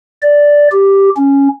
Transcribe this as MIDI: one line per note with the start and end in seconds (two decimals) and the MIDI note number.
0.22 0.68 74
0.72 1.10 67
1.16 1.48 61